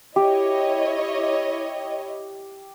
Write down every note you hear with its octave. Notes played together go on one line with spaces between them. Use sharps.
E4 G4 C#5 D#5